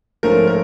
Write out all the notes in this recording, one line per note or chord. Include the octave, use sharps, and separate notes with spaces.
G#2 F3 A3 C#4 A#4
A#4